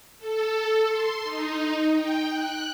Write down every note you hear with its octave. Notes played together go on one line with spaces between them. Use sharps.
A4
C6
D#4
G5
F#6